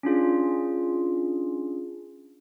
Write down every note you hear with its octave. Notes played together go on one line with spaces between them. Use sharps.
C#4 D4 F4 G#4